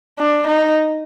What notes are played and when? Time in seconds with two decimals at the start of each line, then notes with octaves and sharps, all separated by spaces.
0.19 D4
0.47 D#4